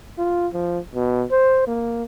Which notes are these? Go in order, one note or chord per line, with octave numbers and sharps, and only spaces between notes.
F4
F3
B2
C5
A#3